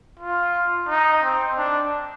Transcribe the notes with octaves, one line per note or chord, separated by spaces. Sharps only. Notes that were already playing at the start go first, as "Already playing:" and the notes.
F4
D#4
C4
D4